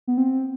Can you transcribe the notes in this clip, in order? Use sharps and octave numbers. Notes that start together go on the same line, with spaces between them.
B3
C4